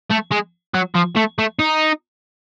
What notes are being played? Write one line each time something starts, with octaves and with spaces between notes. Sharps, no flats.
A3
G#3
F#3
F3
A3
A3
D#4